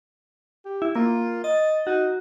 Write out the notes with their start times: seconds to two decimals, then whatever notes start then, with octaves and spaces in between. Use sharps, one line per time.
0.65 G4
0.82 E4
0.96 A#3 F4
1.44 D#5 A6
1.87 D#4 F#4